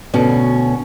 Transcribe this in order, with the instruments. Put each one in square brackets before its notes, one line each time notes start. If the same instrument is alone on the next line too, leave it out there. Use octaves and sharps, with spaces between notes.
[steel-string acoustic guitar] D2 B2 C#4